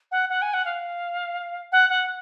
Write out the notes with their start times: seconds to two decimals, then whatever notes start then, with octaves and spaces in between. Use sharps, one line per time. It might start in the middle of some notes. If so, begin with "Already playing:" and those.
0.11 F#5
0.29 F#5
0.41 G#5
0.53 F#5
0.65 F5
1.72 F#5
1.90 F#5